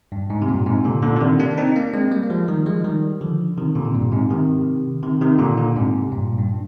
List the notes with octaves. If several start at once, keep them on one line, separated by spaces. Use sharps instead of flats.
G2
G#2
C3
G2 A#2
G#2 C3
A#2 D3
A#2 D3
D3
C3 D#3
A#3 D4
C4 D#4
A#3 D4
G#3 C4
G3 A#3
A#3
F3 G#3
D#3 G3
F3 G#3
D#3 G3
D3 F3
C3 D#3
A#2 D3
C3
G2 A#2
G#2 C3
C3 D#3
C3 D#3
C3 D#3
A#2 D3
A#2 D3
G#2 C3
G2 A#2
G2